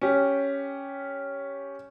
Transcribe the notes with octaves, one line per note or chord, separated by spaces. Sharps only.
C#4 G4